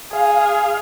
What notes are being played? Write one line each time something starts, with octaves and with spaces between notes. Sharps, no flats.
G#4 F5